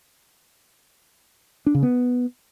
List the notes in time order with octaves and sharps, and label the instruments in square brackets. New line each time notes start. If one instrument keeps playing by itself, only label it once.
[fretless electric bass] D4
C#3
B3